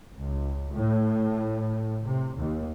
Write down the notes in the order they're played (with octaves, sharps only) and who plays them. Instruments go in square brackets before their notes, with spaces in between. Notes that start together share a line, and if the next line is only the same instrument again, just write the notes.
[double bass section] C#2
A2
C3
D#2